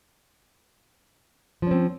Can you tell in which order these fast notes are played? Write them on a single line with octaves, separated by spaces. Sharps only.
F3 C#4 C4